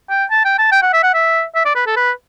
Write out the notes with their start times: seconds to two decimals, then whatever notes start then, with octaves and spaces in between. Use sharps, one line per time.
0.10 G5
0.31 A5
0.45 G5
0.58 A5
0.72 G5
0.82 F#5
0.93 E5
1.03 F#5
1.14 E5
1.55 E5
1.65 D5
1.75 B4
1.86 A4
1.96 B4